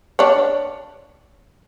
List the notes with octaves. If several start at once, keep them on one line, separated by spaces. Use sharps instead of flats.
D4 C#5